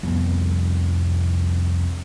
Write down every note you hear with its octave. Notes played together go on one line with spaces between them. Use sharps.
C2 F2 B3